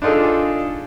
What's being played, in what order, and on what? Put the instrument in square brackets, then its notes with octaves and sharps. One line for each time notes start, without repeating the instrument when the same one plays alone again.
[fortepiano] D4 D#4 F4 G#4 A4